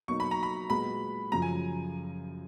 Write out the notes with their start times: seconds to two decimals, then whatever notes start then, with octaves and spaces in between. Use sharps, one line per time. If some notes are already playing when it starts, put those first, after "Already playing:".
0.08 B2 F#3 A#3 D#4 C#6
0.20 B5
0.31 A#5
0.43 B5
0.70 A#2 G#3 B3 F#4 B5
1.32 F#2 C#3 F3 A#5
1.42 G#5